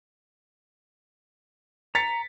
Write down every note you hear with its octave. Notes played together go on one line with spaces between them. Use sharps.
A#5 A6 B6 C#7